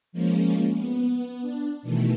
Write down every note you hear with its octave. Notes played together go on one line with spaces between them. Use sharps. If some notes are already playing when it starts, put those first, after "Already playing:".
F3 G#3 A#3 C#4
B3
D4
B2 D#3 E3 A3